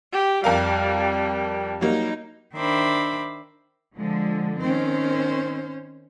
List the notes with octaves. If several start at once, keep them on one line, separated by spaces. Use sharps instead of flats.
G4
F2 G3 A#4 F5
F#3 G3 A#3 D#4
D#3 D4 C5 E5 B5 D6
D3 F3 G#3
D#3 C4 C#4 C5